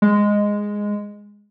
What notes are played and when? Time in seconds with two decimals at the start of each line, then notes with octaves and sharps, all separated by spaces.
0.02 G#3